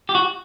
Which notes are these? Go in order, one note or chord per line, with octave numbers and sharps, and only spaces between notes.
G4
F#4